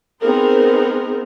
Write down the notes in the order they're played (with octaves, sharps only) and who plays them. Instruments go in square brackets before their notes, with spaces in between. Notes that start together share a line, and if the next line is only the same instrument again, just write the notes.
[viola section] B3 C4 D#4 G#4 A#4 C5